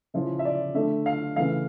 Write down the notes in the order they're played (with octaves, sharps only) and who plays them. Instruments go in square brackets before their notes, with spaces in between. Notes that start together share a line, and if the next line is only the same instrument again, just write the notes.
[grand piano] C#3 F3 C#4 E4
E5
D5
D3 A3 D4 E5
F5
C#3 E3 A3 F5